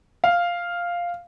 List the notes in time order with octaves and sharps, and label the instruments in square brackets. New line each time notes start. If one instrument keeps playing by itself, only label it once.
[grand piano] F5